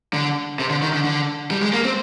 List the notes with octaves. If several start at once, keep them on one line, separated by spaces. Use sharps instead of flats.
D3
C3
D3
D#3
D3
D3
G3
G#3
A#3
C4